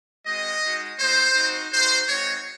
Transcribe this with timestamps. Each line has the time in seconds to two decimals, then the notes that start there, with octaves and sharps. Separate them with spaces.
0.26 G#3 C4 F#4 D#5
0.63 G#3 D#4 F#4
0.99 A3 D#4 F#4 C5
1.35 C4 D#4 F#4
1.72 G#3 D#4 F#4 C5
2.08 G#3 C4 D#4 F#4 C#5